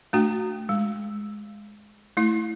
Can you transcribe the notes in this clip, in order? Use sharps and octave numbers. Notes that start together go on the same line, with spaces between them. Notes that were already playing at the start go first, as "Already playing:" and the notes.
A3 D4 F#4 G5
G#3
A3 E4